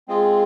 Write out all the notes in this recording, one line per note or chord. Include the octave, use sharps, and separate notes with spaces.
G#3 C4 F4 G#4